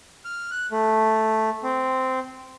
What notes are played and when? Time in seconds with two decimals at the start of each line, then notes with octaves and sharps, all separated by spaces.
0.25 F6
0.51 F#6
0.72 A3
1.63 C4